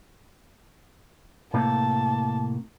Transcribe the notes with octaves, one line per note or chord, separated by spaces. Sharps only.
A2 C3 A#3 A5